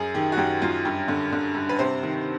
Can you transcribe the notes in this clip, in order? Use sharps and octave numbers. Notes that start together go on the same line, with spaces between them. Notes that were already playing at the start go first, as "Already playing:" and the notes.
Already playing: F#2 G#4
D#3 G4
F#4
F#2 G4
F#2 F4
G2 G4
D3
D3
G2
B4
C3 C5
D#3